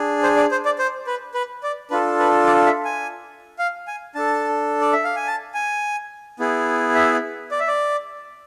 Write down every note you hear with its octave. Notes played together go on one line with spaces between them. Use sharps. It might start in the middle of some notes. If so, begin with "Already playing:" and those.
Already playing: D4 G#4
C5
D5
C5
D5
C5
B4
B4
D5
D4 F4 A4 B4
B4
D5
E5
G#5
F5
G#5
D4 A4 A5
D5
E5
F5
G#5
A5
G#5
B3 E4 G#4
E5
D5
E5
D5